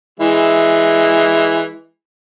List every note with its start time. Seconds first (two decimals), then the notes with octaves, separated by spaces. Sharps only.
0.20 E3 G#3 E4